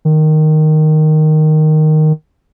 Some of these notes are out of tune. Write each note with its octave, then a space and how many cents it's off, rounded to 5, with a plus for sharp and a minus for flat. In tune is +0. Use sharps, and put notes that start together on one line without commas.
D#3 -5